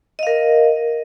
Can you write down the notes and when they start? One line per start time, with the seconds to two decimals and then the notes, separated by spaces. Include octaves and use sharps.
0.19 D#5
0.23 F5
0.27 A#4